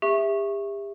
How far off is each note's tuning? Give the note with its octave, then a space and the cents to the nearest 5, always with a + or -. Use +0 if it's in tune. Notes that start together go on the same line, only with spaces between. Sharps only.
G4 +40 E5 +0 C#6 -15